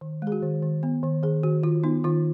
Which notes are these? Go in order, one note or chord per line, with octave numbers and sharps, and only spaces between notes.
D#3
G#3 G#4
F#4
D#3
D#3
B3
D#3
D#3 G#4
D#3 F#4
D#3 F4
B3 D#4
D#3 F4